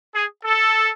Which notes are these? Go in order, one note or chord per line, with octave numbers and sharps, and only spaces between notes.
G#4
A4